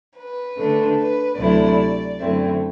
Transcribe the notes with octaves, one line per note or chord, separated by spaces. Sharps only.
B4
D3 A3 D4
B4
D2 C3 F#3 A3 E4 D5
F#2 D3 A3 C4 E4